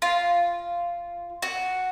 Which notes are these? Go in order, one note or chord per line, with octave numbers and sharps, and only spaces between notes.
F4
F#4